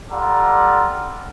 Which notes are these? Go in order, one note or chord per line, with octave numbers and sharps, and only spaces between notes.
G3 F4 A4 D5 F#5 A#5